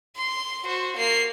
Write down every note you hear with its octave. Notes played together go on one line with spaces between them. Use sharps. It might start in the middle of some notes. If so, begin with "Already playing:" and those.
C6
F#4 C5
A#3 C7